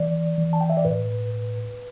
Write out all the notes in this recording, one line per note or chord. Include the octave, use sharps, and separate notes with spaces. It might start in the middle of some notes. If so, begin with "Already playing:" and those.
Already playing: E3 D5
E3
A5
G5
E5
D5
A2 B4